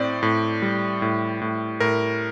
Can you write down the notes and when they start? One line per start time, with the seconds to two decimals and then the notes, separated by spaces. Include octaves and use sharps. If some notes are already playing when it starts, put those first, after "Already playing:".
Already playing: A2 C4 D5
0.23 A2
0.62 G3
1.02 A2
1.41 A2
1.80 A2 A#4